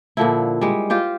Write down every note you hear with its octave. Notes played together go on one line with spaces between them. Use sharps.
A#2 D3 F3 E4
G3 G#3
F4 G4 C5